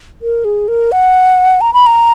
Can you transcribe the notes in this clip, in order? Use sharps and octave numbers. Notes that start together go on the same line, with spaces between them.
A#4
G#4
A#4
F#5
A#5
B5
A#5